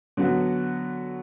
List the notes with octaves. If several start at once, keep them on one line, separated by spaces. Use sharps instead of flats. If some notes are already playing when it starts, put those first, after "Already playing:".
D3 F#3 B3 F#4